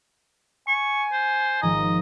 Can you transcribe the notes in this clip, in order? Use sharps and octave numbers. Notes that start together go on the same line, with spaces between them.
G#5 C#6
C5
G#1 F3 D#5 A#5